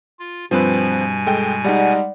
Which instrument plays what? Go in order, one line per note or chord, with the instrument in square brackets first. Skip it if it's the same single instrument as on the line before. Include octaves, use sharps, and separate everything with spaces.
[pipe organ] F4
[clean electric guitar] G2 [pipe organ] B2 G#5 [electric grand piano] F3 C4 B4
[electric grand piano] G#3 A4 G5
[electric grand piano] G3 G#3 D#4 [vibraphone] D5 F#5